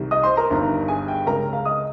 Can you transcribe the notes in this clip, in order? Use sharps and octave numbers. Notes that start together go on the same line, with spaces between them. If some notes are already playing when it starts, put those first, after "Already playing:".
Already playing: C2 C3 D#3
D#5 D#6
C5 C6
A#4 A#5
G1 G2 D#3
G#4 G#5
G5
C#2 C#3 A#4 A#5
F5
D#5 D#6